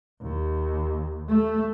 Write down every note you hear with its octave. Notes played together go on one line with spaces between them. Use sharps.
D#2
A3